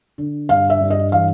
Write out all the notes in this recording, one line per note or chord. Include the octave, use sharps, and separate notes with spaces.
D3
G2 F5
E5
G2
D#5
E3 F5